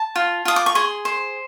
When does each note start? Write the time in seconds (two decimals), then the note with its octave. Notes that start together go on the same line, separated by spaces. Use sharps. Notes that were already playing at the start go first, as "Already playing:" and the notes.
Already playing: A5
0.16 F4
0.45 F4 D#6
0.56 D6
0.66 C#6
0.75 G#4 C6
1.05 C5